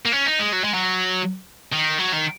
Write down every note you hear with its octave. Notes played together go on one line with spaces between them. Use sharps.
A#3
C#4
D#4
G#3
F#3
G#3
F#3
D#3
F#3
D#3